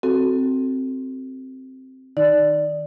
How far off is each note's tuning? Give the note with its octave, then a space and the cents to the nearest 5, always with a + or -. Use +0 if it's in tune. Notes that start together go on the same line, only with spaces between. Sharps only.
C4 +0 F#4 +10 A4 +0
D#3 +0 D#4 +0 D5 +0